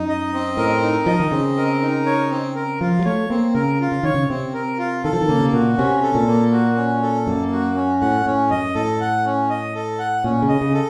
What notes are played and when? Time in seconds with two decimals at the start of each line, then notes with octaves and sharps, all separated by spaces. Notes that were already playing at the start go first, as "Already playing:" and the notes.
Already playing: F#2 D#4
0.09 D#5
0.33 C4
0.57 A2 A#4
0.82 D#4
1.06 F3 D#5
1.20 D#3
1.31 C#3 C4
1.57 A#4
1.81 D#4
2.06 C#5
2.31 C4
2.55 A#4
2.81 F3 F4
2.99 F#3
3.05 A3 C#5
3.30 A#3 C4
3.54 C#3 A#4
3.80 F4
3.92 C#3
4.03 D#3 C#5
4.14 C#3
4.29 C3 C4
4.54 A#4
4.78 F4
5.04 D#3 A4
5.13 F3
5.21 D#3
5.28 C#3 A#3
5.41 C3
5.53 A#2 F#4
5.78 C3 C#4
6.03 A4
6.15 A#2
6.27 A#3
6.52 F#4
6.77 C#4
7.02 A4
7.27 F#2 A#3
7.52 F#4
7.76 C#4
8.01 A2 F#5
8.26 A2 C#4
8.50 F#2 D#5
8.75 A2 A4
9.01 F#5
9.25 C#4
9.50 D#5
9.75 A4
9.99 F#5
10.24 A#2 C#4
10.42 C#3
10.48 D#5
10.61 C#3
10.74 A4